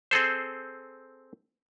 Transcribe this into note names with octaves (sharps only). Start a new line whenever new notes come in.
C4 G#4 A4 C5